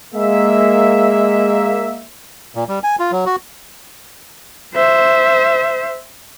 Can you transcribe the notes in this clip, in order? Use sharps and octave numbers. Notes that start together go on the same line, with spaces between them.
G#3 A#3 E5
A#2
G3
G#5
F4
F#3
F#4
C5 E5